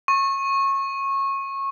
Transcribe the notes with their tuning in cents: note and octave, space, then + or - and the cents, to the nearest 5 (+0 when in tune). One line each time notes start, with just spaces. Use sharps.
C#6 -20